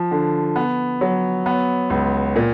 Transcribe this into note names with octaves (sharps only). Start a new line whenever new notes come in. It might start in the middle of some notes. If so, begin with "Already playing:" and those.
Already playing: F3
D3
B3
F#3
B3
C#2
A#2